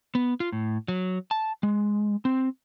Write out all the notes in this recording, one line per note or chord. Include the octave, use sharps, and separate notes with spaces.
B3
F4
A2
F#3
A5
G#3
C4